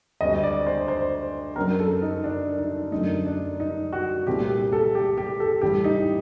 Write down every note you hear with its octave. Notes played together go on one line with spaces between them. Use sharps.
D2 D3 G3 C4 D#5
D5
C5
C5
F#2 F#3 C4 A#4
A4
D#4
D4
D#4
F#2 D3 F#3 A3 D#4
D4
D#4
F#4
C2 A#2 A3 C4 G4
G4
A4
G4
G4
A4
A1 A2 G3 G4
D#4